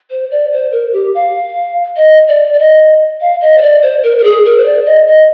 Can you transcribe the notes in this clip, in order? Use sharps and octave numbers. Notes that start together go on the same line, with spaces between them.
C5
D5
C5
A#4
G4
F5
D#5
D5
D5
D#5
F5
D#5
C5
D5
C5
A#4
A#4
G#4
A#4
C5
D5
D#5
D#5